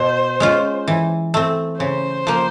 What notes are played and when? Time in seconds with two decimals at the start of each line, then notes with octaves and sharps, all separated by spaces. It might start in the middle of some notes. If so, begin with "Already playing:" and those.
Already playing: B2 C5
0.40 G#3 C#4 F4
0.88 E3
1.34 A3 C4
1.80 C#3 C5
2.27 F3 A#3